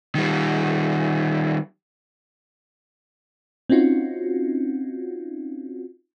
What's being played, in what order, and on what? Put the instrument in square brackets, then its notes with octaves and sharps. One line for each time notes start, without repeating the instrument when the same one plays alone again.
[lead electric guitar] D#3 G3
[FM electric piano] C4 C#4 D#4 F4 F#4